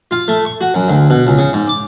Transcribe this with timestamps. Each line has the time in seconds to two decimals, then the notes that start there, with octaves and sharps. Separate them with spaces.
0.11 F4
0.28 A3
0.45 C#6
0.61 F#4
0.74 F#2
0.88 D2
1.10 B2
1.27 C#2
1.38 C#3
1.53 G#2
1.68 D6